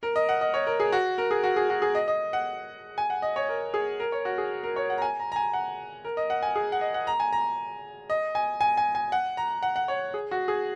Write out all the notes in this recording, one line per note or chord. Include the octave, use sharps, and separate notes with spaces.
A#4
D#5
F#5
D#5
C#5
A#4
G#4
F#4
A#4
G#4
F#4
G#4
F#4
G#4
D#5
D#5
F#5
G#5
F#5
D#5
C#5
A#4
G#4
A#4
C#5
F#4
G#4
A#4
C#5
F#5
A#5
G#5
A#5
A#5
G#5
F#5
A#4
D#5
F#5
G#5
G#4
F#5
D#5
F#5
A#5
G#5
A#5
D#5
G#5
G#5
G#5
G#5
F#5
A#5
F#5
F#5
C#5
G#4
F#4
G#4